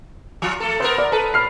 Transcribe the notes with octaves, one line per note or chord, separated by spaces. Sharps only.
F3 F4
A3 A4
B3 A4 A#4 C5
D5
A4 B4
A2 B5 F6 C7